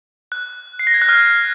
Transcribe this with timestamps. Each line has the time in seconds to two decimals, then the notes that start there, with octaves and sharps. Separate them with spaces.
0.32 F#6
0.79 C7
0.87 A#6
0.94 G#6
1.02 F#6
1.09 F6